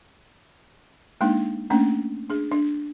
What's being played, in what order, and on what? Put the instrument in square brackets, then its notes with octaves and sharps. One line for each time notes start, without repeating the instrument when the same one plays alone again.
[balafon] G#3 A#3 D4 D#4
A3 A#3 C#4 D4
D4 G#4
D4